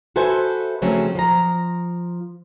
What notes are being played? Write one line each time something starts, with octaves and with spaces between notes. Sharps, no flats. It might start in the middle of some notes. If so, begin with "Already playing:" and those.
F#4 A4 B4 C5 E5 G#5
C#3 F3 F#3 A3 C4 C#4
F3 A#5